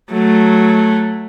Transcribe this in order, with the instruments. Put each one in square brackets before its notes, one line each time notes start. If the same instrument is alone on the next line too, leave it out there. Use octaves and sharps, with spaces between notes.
[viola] F#3 A3